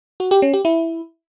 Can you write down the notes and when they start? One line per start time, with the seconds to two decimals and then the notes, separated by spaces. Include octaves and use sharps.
0.20 F#4
0.31 G4
0.42 C#4
0.53 G4
0.65 E4